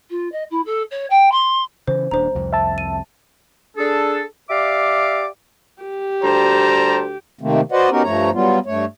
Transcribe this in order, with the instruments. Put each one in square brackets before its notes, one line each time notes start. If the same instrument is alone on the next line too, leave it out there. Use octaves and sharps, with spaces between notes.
[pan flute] F4
D#5
E4
A4
C#5
G5
C6
[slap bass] C#3 E3 [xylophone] C5
[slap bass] D#1 D4 [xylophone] C5 A#5
[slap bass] C2 F2
[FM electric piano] E5 A5
[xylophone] D#7
[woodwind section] D4 G#4 A4
G4 D5 E5 F5 D6
[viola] G4
[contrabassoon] D2 [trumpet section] G3 C5 A5 [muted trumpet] A#5
[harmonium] C3 D#3 A3 A#3 C4
F#4 B4 C5 D5 D#5 F#5
B3 C#4 D#4 F#4 G4 A#4
G2 F3 A3 C#5 A#5
F#3 G3 B3 F4
G2 A3 C#5